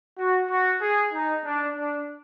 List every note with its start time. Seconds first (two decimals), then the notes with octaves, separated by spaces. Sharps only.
0.18 F#4
0.50 F#4
0.81 G#4
1.12 D#4
1.44 D4
1.75 D4